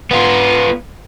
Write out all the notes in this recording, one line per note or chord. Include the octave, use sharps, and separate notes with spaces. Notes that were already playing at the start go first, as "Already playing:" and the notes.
B3 F4